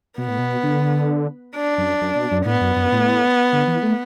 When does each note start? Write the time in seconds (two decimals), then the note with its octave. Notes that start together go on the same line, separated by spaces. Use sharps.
0.18 B2 B3
0.28 A2
0.38 B2
0.63 D3
1.55 D4
1.78 F#2
2.01 F#2
2.16 B2
2.31 F#2
2.46 A2 B3
2.61 F#2
2.76 F#2
2.92 A2
3.53 D3
3.67 E3
3.83 A3